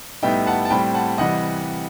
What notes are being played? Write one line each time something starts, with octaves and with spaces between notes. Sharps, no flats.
A2 G3 B3 D#4 E5 G5
F#5 A5
A5
A2 G3 C4 G5 B5
F#5 A5
C3 E3 G3 D#5 F#5